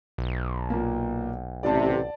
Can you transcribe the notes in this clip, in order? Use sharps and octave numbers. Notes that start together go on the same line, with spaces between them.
B1
A#2 A#3
A1 C3 D5 A5